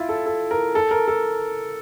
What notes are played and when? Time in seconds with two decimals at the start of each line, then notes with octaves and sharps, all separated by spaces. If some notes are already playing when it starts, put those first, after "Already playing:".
Already playing: E4 F4
0.09 A4
0.26 A4
0.51 A#4
0.75 A4
0.91 A#4
1.08 A4